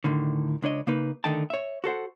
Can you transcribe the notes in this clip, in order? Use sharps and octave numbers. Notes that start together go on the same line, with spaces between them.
D2 A2 D3 D#3
C#2 D4 C#5 D#5
C#3 A#3 D#4 B4
D3 D#3 A3 D#4 G5 A5
C#5 E5
F#4 A4 C5 F#5